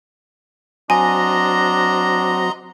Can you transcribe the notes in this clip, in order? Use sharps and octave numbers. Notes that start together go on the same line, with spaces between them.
F#3 C4 D4 F#4 D#5 G#5 A#5 C6